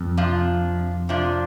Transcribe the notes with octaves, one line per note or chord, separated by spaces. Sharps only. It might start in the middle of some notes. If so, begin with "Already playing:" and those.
Already playing: F2
C3 F3 D4 F4
C3 F3 D4 F4